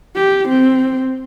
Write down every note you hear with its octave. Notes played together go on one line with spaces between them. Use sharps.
G4
C4